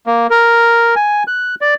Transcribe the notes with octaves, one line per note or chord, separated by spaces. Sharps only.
A#3
A#4
G#5
F#6
D5